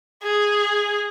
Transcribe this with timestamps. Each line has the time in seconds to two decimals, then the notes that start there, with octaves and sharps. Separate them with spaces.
0.23 G#4